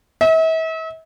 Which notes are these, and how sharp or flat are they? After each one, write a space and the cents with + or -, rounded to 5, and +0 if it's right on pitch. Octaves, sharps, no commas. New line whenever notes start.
E5 -40